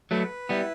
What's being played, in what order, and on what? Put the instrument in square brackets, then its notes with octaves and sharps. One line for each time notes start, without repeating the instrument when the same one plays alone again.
[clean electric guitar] F#3 A3 [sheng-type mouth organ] B4
[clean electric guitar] G3 B3 [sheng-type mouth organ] E4